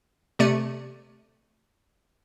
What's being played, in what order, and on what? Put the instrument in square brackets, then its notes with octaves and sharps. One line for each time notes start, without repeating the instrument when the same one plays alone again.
[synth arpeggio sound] C3 A3 D5 C#7 D#7